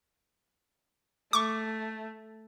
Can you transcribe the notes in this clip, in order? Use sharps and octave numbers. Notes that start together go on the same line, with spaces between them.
A3 C#6 D6